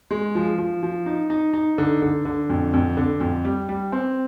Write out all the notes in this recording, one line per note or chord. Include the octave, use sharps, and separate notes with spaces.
G#3
F3
F3
F3
D#4
D#4
D#4
D3
D3
D3
F2
F2
D3
F2
G3
G3
C4